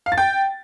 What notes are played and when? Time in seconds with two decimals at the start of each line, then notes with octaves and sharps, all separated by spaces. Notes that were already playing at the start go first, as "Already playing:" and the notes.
0.06 F5
0.12 A6
0.18 G5